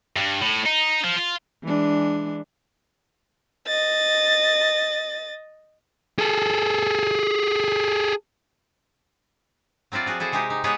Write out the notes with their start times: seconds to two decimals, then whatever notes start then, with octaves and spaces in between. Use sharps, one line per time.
0.16 G2
0.42 A2
0.66 D#4
1.04 F3
1.16 F4
1.63 E3 G#3 D4
3.67 D#5 A6
6.19 G#4 A4
9.92 F#3 C4 E4 F4 D5
10.06 F3 F#4 G#4
10.20 E4 G#4 A4 C5
10.32 C3 G#3 D#4 G4
10.50 D#4
10.64 G#3 B3 G4 G#4 C#5 F#5